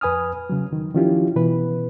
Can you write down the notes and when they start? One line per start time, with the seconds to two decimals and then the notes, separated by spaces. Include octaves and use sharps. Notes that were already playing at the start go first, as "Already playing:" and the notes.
0.01 F2 B4 G#5 D#6 F6
0.50 C#3 F#3
0.73 D#3
0.95 D#3 F3 C#4 E4 F4 G4
1.36 B2 E3 B4